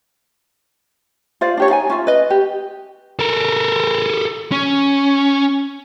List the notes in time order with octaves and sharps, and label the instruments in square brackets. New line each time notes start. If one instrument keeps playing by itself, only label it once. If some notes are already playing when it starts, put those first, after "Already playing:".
[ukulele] F4 C5 D5 F5
D4 G4 C#5
D#4 F5 G#5
C#4 F4 E5
B4 D#5
G4
[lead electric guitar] A4 A#4
C#4